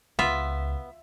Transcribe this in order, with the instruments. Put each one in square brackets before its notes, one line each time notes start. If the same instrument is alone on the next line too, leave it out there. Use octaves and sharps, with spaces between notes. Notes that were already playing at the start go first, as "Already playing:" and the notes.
[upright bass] C#2 [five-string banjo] B3 [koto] F4 [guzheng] E5